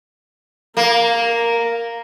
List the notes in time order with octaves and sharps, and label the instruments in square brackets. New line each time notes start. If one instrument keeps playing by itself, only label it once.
[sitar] A#3 [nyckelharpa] A#4